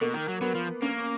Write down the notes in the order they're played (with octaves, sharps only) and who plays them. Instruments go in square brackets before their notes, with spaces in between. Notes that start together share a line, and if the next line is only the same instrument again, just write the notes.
[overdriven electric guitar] B2 [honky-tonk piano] A#3
[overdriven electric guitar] D#3
F#3
[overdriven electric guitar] F#3 [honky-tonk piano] B3
[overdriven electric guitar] F3
[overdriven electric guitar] A#3 [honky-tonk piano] C#4